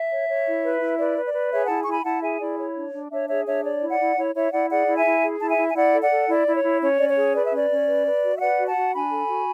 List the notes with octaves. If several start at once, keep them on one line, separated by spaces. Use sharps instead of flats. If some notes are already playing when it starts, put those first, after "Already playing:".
Already playing: E5
C#5
C#5
E4
B4
E4
B4 D5
B4
D5
B4
G#4 C#5 E5
E4 F#5 A5
C#6
E4 G#5 B5
E4 F#5 A5
G#4 E5 G#5
E4 D5
C#5
D4
D4
D4 C#5 E5
G#4 C#5 E5
D4 C#5 E5
C#5 D5
E4
D5 F#5
E4
E4 C#5
E4 C#5 E5
E4 D5 F#5
G#4 D5 F#5
E4
E5 G#5
E4
G#4
E4 A5
E5 G#5
E4
G#5
E4 D5 F#5
A4
D5 F#5
A4
E4 D5
E4
C#5
E4
C#4 C#5
C#4 D5
C#5
G#4
B4 D5
E5
C#4 D5
C#4
B4
B4
F#4
E5
B4 D5 F#5
F#4
F#5 A5
F#4
D4 G#5 B5
A4
F#4